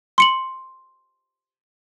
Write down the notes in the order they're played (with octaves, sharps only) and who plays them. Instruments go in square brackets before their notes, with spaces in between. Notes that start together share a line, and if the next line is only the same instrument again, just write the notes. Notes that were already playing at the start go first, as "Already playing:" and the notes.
[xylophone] C6 C#7 F#7